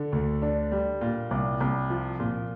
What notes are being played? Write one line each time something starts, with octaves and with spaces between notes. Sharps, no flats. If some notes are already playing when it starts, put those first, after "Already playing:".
Already playing: D3
D2
D4
G3
A#2
C2
C2
F3
A#2